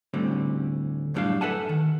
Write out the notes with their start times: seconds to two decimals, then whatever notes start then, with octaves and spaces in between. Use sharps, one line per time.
0.14 D2 A2 D3 G3 C4 C#4
1.14 F#2 A2 E3 G3 D4 F5
1.41 A4 B4 E5 F#5 G#5 A5
1.69 D#3